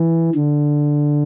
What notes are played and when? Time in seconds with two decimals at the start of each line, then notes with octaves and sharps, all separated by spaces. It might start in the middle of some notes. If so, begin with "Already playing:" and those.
Already playing: E3
0.35 D3